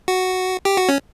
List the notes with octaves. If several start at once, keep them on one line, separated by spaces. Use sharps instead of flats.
F#4
G4
F#4
C#4